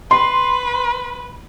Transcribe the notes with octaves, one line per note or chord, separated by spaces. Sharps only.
B4 C6